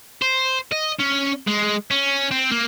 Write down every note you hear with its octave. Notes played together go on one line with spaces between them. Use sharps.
C5
D#5
C#4
G#3
C#4
C4
A#3